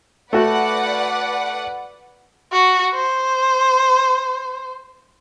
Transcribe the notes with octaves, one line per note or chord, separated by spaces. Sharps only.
A3 F#4 B4 D5 F#5
F#4
C5